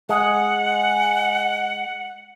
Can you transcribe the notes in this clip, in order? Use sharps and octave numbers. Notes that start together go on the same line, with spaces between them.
G#3 F#5